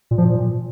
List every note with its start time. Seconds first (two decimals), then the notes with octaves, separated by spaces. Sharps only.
0.11 A#2
0.18 F3
0.25 A#2